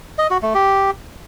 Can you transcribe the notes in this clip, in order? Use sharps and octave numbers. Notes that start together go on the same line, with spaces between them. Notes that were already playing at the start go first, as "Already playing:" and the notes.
D#5
F#4
A3
G4